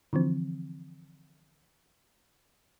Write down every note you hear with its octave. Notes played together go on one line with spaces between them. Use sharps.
D3 E3 F3 C4